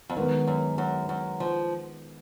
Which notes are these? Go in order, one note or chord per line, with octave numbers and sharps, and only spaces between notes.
F2
F#2 D#3 G#3 B3
F#2
F#2
F#2
F3